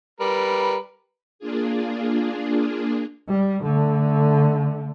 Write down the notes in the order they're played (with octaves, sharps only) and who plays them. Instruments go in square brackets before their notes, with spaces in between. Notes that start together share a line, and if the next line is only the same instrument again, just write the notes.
[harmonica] G3 A#4 B4
[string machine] A#3 D4 F4 G#4
[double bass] G3
D3 A3